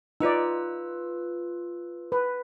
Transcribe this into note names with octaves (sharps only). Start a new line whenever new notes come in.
D#4 F4 B4 D5 E6
B4